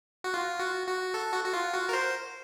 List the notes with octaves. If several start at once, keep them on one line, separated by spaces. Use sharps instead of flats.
F#4
F4
F#4
F#4
A4
F#4
F#4
F4
F#4
A#4
C5